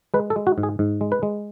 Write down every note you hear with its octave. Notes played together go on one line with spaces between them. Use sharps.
G#3 B4
A4
G#3
F#4
G#2
G#4
G#2
G#3
B4
G#3